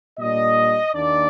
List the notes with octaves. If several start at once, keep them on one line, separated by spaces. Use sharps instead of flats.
A#2 G3 D4 D#5
D#2 D#3 A#3 D4 D5